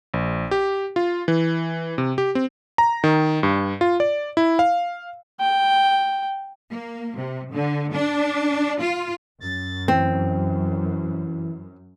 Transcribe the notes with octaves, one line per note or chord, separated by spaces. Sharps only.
A#1
G4
F4
E3
C3
G4
C4
A#5
D#3
G2
F4
D5
E4
F5
G5
A#3
C3
D3
D4
F4
F#2 A6
E3 C4